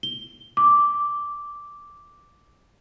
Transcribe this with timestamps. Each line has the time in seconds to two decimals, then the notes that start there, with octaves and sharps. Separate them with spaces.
0.03 G7
0.57 D6